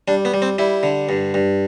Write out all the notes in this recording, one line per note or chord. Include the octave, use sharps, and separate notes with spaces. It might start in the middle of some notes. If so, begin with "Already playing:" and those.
G3 D4
B3
G3
C4
G3 E4
D3
G2
G2